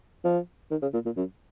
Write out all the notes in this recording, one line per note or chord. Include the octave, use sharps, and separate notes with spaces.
F3
D#3
C#3
A#2
A#2
F#2